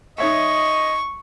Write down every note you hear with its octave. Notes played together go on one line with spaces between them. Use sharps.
D#4 C#5 D#5 E5 C#6